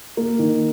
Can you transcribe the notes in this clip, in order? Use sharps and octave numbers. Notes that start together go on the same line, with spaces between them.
A#3
D#3